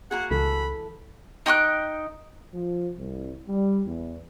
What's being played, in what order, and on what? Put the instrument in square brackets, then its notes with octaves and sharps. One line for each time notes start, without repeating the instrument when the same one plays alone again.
[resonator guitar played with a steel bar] A#3 F#4 G#4 [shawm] F#5
[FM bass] C#2 [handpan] E3 A4 [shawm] B5
[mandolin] D#4 G5 C#6 F#6
[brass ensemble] F3
C2
G3
E2